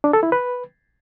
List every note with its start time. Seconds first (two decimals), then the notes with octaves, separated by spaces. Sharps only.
0.04 D4
0.13 A4
0.23 E4
0.32 B4